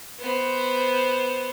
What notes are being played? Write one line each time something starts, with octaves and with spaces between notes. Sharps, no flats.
B3 C5